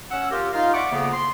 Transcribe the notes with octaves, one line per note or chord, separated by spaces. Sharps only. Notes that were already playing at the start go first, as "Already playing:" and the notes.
C#4 F#5 E6
F4 G4 A#4
D#4 F4 F5
D5 E5 F#5 C#6 D6
F2 C#3 A#3 B3
C6